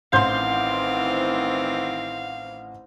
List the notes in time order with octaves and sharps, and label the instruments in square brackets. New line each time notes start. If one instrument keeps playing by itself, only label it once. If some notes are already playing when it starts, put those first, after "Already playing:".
[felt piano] A1 C6 [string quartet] D#3 E3 C4 [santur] C5 [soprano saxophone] F5